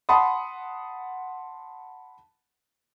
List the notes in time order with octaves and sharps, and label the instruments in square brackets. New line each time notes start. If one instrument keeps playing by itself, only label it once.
[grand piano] F#5 A5 B5 C6 D#6